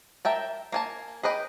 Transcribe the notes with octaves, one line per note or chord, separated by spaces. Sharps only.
A#4 E5 G5 A5
A#3 G#5 A5
G#4 B4 D#5 G5